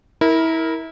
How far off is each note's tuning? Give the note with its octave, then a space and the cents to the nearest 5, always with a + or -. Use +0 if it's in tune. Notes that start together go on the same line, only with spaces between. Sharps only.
E4 -25 A#4 +0